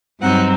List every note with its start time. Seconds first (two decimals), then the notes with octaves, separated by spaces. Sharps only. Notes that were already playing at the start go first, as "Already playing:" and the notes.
0.21 G2 F#3 C4 D#4 F#5